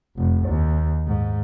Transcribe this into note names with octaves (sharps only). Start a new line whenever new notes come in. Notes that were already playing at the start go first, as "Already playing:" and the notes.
F1
D#2
G#2